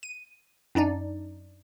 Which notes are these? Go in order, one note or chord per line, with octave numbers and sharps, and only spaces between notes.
D#7
F#2 D4 D#4 D5